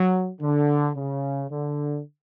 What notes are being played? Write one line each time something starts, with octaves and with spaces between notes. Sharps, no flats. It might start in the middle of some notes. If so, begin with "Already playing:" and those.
Already playing: F#3
D3
C#3
D3